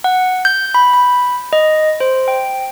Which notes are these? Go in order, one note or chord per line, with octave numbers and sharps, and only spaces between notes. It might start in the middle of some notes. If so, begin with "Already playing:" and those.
F#5
G6
B5
B5
D#5
C5
G5